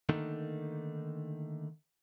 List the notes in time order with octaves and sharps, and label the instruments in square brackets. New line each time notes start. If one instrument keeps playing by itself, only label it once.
[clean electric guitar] D3 D#3 A3 A#3 D#4